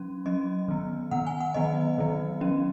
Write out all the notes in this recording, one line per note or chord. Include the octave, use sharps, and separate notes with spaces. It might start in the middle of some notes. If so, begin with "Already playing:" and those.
Already playing: F#3 C#4
F#3 C#4 D#5
D#3 B3
D#3 B3 F#5
G#5
F#5
D#3 F#3 B3 D#5
D#3 F#3 B3
F#3 C#4